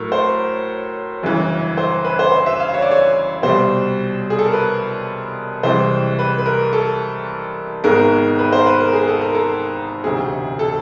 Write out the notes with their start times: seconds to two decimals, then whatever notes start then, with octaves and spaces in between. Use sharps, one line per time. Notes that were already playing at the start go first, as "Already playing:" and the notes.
Already playing: A2 F#3 A3 A#4
0.12 C5
1.23 G1 F#2 C#3 E3
1.77 C5
2.05 B4
2.19 C5
2.32 C5
2.46 E5
2.60 F5
2.74 C#5
2.82 D5
2.91 C#5
3.43 C2 B2 G3 C5
4.30 G#4
4.39 A4
4.46 A#4
4.53 B4
5.63 C2 C3 E3 G#3 C5
6.19 B4
6.39 B4
6.46 A#4
6.73 A4
7.84 G#1 G#2 D#3 G#3 B3 A#4
8.39 B4
8.53 C5
8.66 B4
8.80 A#4
8.93 G#4
9.08 A4
9.21 A#4
9.35 A4
10.04 E1 D2 C3 G#4
10.59 A4